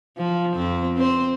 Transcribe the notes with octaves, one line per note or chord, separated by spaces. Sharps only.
F3
F2 C4
C4 C5